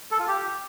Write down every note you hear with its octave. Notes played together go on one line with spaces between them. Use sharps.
A4
F4
G4